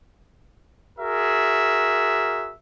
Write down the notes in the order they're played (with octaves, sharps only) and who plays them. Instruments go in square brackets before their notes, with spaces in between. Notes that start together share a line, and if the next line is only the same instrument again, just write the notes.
[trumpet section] F#4 G#4 A#4 E5